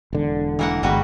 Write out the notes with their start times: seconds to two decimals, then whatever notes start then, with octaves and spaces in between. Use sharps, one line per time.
0.13 E1 D3
0.59 E3 A#3 F#5
0.83 G1 G3 G#3 F#4 B4